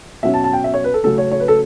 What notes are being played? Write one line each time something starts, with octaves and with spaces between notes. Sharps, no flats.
B2 F#3 C#4 E5
A5
A5
G5
E5
C#5
B4
A4
C#3 F#3 A3 C#4 A4
C#5
C#5
B4
A4